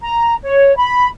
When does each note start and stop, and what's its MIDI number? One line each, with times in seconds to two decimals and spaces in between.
0.02 0.36 82
0.43 0.75 73
0.76 1.07 83